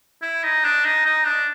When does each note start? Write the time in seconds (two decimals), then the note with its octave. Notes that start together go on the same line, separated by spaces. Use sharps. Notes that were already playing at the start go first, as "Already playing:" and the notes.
0.22 E4
0.43 D#4
0.64 D4
0.85 D#4
1.05 D#4
1.26 D4